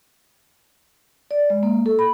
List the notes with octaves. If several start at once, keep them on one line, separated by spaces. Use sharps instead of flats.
D5
G#3
A#3
A4
B5